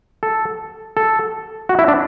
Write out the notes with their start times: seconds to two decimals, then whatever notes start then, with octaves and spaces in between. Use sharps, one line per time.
0.23 A4
0.97 A4
1.69 F#4
1.79 E4
1.88 D4